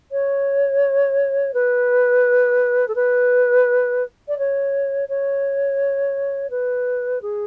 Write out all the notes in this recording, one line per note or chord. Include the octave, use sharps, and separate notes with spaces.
C#5
B4
A4
B4
D5
C#5
C#5
B4
G#4